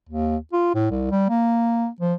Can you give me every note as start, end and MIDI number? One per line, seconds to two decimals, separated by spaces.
0.09 0.37 39
0.53 0.72 65
0.75 0.90 45
0.91 1.08 36
1.11 1.29 55
1.29 1.88 58
2.00 2.14 53